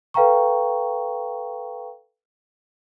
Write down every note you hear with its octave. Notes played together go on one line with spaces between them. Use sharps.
A4 B4 F5 G5 A#5 C#6